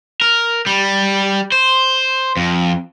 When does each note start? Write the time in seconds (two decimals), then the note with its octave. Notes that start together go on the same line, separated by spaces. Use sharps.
0.21 A#4
0.66 G3
1.52 C5
2.37 F2